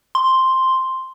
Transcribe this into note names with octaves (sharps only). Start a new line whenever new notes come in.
C6